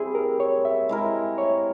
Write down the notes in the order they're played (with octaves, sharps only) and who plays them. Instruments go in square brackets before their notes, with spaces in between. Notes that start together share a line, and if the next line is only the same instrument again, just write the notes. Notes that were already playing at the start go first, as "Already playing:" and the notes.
Already playing: [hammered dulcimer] G3 C4 E4 [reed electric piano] G#4
[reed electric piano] A#4
C#5
E5
[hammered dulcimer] G#3 E4 A#4
[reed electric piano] C#5